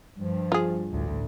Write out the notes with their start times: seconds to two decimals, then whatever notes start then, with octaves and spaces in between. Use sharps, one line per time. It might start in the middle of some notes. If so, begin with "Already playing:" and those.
0.18 G2 F3
0.52 F4 G#4
0.89 A1 D2